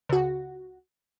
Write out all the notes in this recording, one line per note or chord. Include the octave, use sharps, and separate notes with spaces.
C#2 F#4